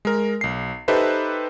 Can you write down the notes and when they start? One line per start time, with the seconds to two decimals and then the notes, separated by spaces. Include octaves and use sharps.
0.05 G#3 A#4
0.41 B1 C7
0.88 D#4 G4 A4 B4 C5 E5